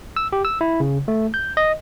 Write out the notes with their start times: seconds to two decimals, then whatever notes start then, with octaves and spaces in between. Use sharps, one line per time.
0.16 E6
0.33 G4
0.45 E6
0.61 E4
0.80 C#3
1.08 A3
1.34 G6
1.57 D#5